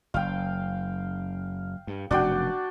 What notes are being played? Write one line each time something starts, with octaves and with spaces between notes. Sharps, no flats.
F#1 F5 G5
G2
F1 F#2 B2 D4 F#4 G5